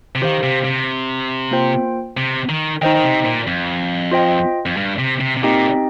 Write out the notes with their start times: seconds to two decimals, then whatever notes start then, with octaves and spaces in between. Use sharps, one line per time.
0.15 C3
0.22 D#3 G4 C5 F5
0.43 C3
0.65 C3
1.51 A#3 F4 C5 G5
2.17 C3
2.49 D#3
2.82 D#3 D#4 C5 D#5 G5
2.95 D#3
3.04 C3
3.25 A#2
3.47 F2
4.11 F4 C5 D#5 G5
4.66 F2
4.77 G2
4.99 C3
5.20 C3
5.37 C3
5.43 A#2 C4 D#4 G4 D#5 G5